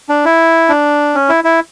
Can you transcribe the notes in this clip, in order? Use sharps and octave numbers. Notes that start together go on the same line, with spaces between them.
D4
E4
D4
C#4
E4
E4